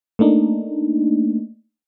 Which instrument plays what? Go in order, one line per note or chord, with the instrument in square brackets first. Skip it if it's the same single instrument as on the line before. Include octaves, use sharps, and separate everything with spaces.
[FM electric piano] A3 A#3 D4 D#4